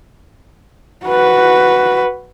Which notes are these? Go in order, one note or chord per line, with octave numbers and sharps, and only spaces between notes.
F#4 B4